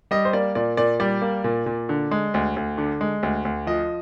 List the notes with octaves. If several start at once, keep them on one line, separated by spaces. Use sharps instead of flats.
G3 D#5
C5
A#3 D5
A#2 D5
A#2 D5
G3 D5
A#3
A#2
A#2
D3
G#3
D2
D2
D3
G#3
D2
D2
F3 D#5